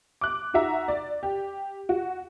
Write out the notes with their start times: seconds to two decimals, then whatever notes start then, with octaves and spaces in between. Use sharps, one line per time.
0.21 D6 F#6
0.54 D#4 F#4 E5 A#5
0.88 D5
1.23 G4
1.89 F#4